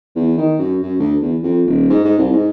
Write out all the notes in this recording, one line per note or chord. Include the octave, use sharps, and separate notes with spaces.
E2
D#3
F#2
F#2
D2
E2
F2
D#1
G#2
G#2
C2
G#2